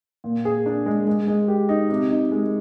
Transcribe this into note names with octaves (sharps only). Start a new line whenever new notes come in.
A#2
G#4
D4
G#3
G#3
G#3
G4
D#4
C3
D#4
G#3